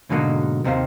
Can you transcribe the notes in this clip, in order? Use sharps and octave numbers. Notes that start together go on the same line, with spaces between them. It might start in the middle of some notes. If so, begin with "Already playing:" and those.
G#2 B2 D3 F#3 A#3 D#4
D#2 C3 D#3 C5 F5